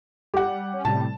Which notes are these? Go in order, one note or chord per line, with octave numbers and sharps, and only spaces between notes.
G3 G4 F#5
C#4
A2 C3 G3 A5